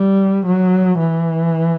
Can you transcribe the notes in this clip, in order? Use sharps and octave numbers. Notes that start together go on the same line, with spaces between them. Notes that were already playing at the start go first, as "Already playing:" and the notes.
Already playing: G3
F#3
E3